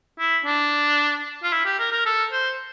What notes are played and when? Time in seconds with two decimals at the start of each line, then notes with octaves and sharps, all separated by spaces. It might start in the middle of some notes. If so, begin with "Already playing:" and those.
0.19 E4
0.45 D4
1.43 F4
1.52 E4
1.65 G4
1.79 A#4
1.92 A#4
2.05 A4
2.32 C5